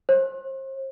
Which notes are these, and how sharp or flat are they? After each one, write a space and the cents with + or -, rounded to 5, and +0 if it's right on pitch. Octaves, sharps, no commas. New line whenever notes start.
C5 +35